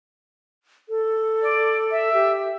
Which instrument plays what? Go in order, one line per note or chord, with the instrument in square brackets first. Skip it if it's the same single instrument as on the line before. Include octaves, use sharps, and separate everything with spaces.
[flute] A4
[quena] D5
E5
[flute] G4